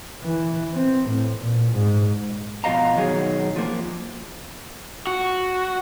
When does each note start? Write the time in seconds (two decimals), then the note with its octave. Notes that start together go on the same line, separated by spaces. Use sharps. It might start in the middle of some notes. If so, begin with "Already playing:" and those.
0.22 E3
0.75 C4
1.09 A2
1.37 A#2
1.72 G#2
2.64 B2 F3 E4 D#5 F5 A#5
2.96 B2 D#3 F#3 G#4
3.56 F3 A#3
5.07 F#4